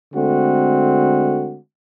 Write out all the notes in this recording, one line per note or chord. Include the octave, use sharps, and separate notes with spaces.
D3 G#3 A3 C4 F#4